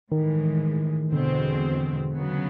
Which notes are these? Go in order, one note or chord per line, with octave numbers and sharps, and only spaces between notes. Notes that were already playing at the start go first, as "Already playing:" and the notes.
A2 D#3 E3 G#3
E2 B2 D3 G#3 C4
C#3 F#3 B3